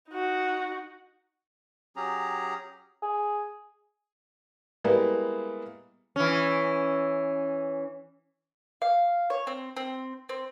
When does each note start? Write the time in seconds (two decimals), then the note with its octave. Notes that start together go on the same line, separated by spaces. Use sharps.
0.11 D#4 F#4
1.96 F#3 C#4 G4 G#4 A#5
3.02 G#4
4.84 G3 G#3 A#3 B3 E4
6.16 E3 C#4
8.82 F5
9.30 C#5
9.47 C4
9.76 C4
10.29 C4